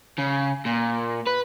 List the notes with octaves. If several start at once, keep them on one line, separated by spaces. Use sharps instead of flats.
C#3
A#2
B4